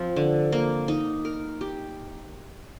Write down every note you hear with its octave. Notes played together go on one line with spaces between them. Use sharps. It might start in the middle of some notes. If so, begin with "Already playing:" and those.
Already playing: F3 C4
D3
A#3
D#4
A#4
G4